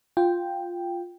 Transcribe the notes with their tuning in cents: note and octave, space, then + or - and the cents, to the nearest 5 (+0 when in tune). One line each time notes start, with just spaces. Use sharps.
F4 +0 G5 +0